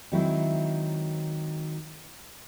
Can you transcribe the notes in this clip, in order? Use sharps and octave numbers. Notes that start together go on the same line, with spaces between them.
D#3 F#3 G#3 C4 E4